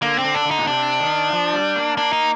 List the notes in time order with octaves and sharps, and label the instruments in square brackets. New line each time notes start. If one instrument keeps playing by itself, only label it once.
[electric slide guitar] D3 [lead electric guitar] A#3
[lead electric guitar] C4
[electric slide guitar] D3
[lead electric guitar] D4
[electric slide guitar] D3
[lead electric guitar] D#4
[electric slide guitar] A#2
[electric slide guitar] C3 [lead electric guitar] D4
[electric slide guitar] D#3
F3
G3
A#3
[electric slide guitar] A#3 [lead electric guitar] D4
[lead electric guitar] D#4